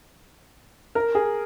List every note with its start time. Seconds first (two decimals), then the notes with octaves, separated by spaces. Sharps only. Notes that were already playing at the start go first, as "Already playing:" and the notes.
0.95 A#4
1.15 G#4